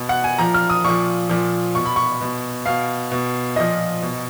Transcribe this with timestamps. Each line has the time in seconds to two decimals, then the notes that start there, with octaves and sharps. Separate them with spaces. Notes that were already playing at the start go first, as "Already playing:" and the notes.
Already playing: B2
0.09 F#5
0.24 G#5
0.39 A#2 F3 A#5
0.54 F6
0.70 D#6
0.84 A#2 F3 C#6
1.29 A#2 F3
1.75 B2 C#6
1.86 B5
1.96 C#6
2.21 B2
2.66 B2 F5
3.12 B2
3.56 A#2 F3 D#5
4.02 B2